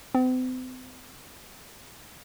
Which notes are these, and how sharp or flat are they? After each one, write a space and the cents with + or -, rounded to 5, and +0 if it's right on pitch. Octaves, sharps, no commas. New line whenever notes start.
C4 -45